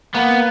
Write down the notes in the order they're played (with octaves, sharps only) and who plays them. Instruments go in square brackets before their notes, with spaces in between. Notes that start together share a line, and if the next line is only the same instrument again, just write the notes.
[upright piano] A#3 [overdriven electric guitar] B3